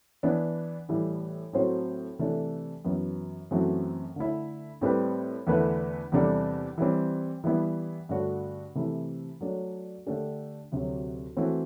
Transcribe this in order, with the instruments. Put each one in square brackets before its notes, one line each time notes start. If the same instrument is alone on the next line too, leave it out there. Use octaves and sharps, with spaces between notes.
[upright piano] E3 B3 D4
A2 E3 G3
A2 F#3 C4 F#4 C5
C3 E3 A3 D4 A4
F#2 E3 B3 E4
F#2 E3 A3 C4 F#4
D3 A3 E4
A2 G3 C4 G4 B4
E2 D3 A3 E4 B4
E2 C3 G3 D4 A4
E3 G3 C4
E3 G3 B3 E4
G2 D3 A3 D4 F#4
C3 E3 A3 E4
F#3 A3 D4 A4 D5
D3 A3 D4 G4
D2 C3 F#3
E3 A3 C4 F#4